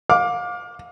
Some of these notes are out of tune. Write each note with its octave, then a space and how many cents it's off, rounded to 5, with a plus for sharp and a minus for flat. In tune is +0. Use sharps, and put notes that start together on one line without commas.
F5 +30 D6 +0